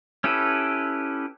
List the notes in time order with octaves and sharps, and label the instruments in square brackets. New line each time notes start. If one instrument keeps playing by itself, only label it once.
[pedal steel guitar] C#4 E4 G4 A4 B4